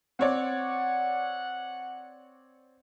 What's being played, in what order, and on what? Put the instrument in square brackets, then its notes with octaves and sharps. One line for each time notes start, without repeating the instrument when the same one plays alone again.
[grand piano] C4 C#5 D5 [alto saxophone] F#5